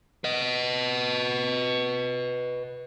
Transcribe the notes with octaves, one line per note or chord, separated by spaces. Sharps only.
B4 D#5